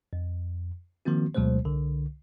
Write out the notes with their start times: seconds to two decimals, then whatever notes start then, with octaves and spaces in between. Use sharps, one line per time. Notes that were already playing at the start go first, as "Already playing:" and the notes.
0.13 F2
1.05 D#3 F3 A#3 C4 F#4
1.35 D2 B2 F#3 G#3 A3 C5
1.65 C2 D3